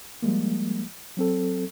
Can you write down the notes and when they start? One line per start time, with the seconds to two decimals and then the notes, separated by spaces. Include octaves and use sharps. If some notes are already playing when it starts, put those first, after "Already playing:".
0.22 F3 G3 G#3 A#3
1.17 F#3 C4 A4